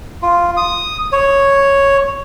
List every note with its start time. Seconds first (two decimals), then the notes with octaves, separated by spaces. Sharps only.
0.22 F4
0.57 D#6
1.12 C#5